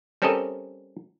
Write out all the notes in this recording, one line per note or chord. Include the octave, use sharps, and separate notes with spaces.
G3 C4 C#4 A4 A#4 D#5